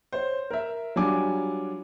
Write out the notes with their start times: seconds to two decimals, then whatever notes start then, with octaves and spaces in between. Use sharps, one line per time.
0.13 C5 C#5
0.51 A#4 E5
0.96 F#3 G3 D4 F4 G#5 D6